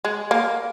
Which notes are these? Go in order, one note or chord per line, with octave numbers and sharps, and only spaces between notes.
G#3
A#3